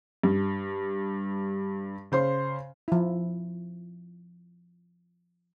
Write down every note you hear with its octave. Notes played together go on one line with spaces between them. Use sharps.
G2
C#3 C5 C6
F3 E4